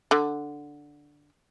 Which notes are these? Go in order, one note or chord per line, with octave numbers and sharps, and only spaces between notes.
D3